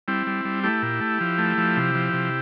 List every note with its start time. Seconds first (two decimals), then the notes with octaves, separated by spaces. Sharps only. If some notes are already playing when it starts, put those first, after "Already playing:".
0.08 G3 C4 E4
0.27 G3
0.45 G3
0.63 A3 E4 G4
0.82 A#2
1.01 A3
1.21 F3
1.38 A3
1.58 F3
1.77 C3
1.95 F3
2.13 C3